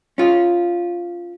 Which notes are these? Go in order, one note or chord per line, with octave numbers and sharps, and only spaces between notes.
C#4 F4